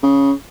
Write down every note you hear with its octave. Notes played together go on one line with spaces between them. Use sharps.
C#3